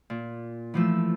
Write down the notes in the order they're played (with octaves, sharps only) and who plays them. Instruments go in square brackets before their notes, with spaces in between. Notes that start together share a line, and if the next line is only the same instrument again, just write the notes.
[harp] A#2
E3 F3 A3 E6